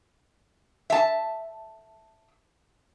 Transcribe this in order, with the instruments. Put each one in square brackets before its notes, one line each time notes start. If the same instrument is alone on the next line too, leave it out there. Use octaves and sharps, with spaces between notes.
[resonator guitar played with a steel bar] E5 A5